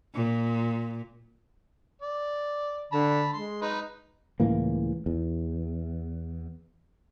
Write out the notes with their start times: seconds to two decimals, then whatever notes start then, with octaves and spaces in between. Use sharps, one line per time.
0.14 A#2
2.02 D5
2.92 D3 A5 B5
3.33 G#3 C6
3.62 D#4 B4
4.40 C#2 A2 E3 A#3
5.06 E2